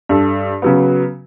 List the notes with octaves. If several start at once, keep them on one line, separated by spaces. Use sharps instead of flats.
G2 A4
C#3 F#3 B3